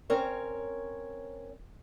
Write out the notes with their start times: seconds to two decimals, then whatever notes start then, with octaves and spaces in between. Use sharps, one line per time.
0.10 C4 C#4 A#4 C#5